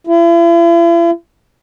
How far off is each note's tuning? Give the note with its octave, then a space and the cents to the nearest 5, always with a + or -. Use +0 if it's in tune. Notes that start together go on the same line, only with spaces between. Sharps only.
E4 +45